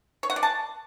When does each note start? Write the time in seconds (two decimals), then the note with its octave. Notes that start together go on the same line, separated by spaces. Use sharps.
0.23 C#5
0.30 F#5
0.36 D5
0.43 A5